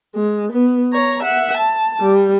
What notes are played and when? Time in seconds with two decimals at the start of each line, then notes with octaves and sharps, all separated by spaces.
0.15 G#3
0.52 B3
0.93 C#5 A#5
1.22 E5 F#5
1.57 A5
2.00 G3